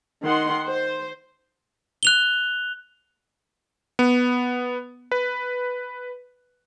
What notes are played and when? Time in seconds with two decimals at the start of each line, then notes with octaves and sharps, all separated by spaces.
0.23 D#3 F#5 C6
0.67 C5
2.03 F#6 F7 G7
3.99 B3
5.12 B4